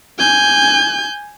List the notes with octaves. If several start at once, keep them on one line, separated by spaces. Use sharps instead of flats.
G#5 G6